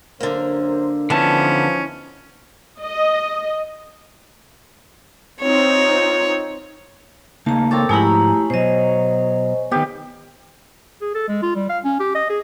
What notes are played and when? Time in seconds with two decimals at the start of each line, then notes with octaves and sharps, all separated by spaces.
0.20 F#2 D3 A#3 A#4 C5
1.10 D3 E3 F3 B3 C#4 D#4 A5
2.83 D#5
5.42 C4 D#4 F4 C#5
7.46 C#3 A#3 D#4 A5 A#5
7.71 C4 A4 A#4 C#5 A5 D6
7.89 G#2 F3 A3 E4 G4 G#4 A#5 B5
8.50 B2 F#3 C5 D#5
9.71 D#3 B3 G4 D#5 F5
11.01 G#4
11.15 A4
11.28 G#3
11.43 F4
11.56 G3
11.69 F5
11.84 C#4
12.00 G4
12.15 D#5
12.30 G#4